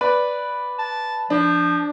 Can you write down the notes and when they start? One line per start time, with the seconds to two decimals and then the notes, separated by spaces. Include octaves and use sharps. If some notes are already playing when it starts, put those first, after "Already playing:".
0.01 B4 D5
0.79 A5
1.30 F3 D4